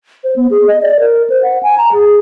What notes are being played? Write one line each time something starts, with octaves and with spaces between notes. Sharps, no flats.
C5
B3
G#4
D#5
D5
A#4
C5
F#5
G#5
A#5
G#4